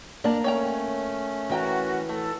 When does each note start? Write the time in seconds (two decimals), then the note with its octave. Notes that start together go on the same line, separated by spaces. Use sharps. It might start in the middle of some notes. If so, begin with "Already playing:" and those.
0.24 A#3 D4 D5 A5 A#5
0.44 A3 C#4 C#5 G5 A#5
1.50 E3 F#4 A#4 G5 A#5
2.09 A3 A4